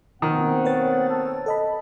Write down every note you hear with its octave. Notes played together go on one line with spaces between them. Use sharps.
B2 D#3 A#3 C4 F#5
B4 C#5 A6
A4
A4 D#5 A5 B5